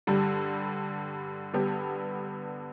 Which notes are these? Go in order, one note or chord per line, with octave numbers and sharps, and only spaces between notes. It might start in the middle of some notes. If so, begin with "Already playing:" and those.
G2 D3 G3
G2 D3 B3 G4